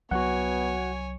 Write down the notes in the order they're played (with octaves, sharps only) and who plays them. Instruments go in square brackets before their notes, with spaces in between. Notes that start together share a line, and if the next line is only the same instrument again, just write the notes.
[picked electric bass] C2 F#3 [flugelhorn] B3 [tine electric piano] F#4 F#5 [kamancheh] C#5 G#5